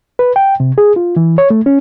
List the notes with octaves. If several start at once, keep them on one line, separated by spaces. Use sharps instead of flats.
B4
G5
C3
G#4
F4
E3
C#5
A3
C#4